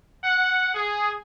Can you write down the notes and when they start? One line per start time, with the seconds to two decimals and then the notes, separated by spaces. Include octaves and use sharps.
0.24 F#5
0.75 G#4